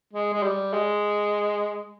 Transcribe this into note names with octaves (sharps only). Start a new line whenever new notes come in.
G#3
G#3
G3
G#3